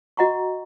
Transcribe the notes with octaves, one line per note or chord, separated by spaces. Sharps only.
F#4 D#5 F#5 A#5 C#6